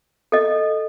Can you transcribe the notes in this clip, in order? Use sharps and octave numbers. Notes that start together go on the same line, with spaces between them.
A4 D#5